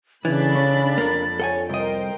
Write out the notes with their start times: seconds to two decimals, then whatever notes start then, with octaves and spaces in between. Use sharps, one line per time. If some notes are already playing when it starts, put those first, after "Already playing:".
0.25 C#3 E3 D4 A4 B5 A6
0.55 C#4
0.98 F2 A#3 A#4
1.40 A4 C#5 F#5 G#5
1.69 C2 A#4 C5 D#5 G5